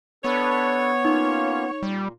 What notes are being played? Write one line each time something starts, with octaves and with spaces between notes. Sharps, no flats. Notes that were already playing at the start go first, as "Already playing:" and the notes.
B3 D4 A4 B4 C#5
A#3 C#4 D#4 F4
A#2 G3